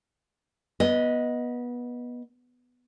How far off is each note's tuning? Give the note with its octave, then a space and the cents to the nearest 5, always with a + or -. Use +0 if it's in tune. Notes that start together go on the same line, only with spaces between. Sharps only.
B3 -20 D#5 +5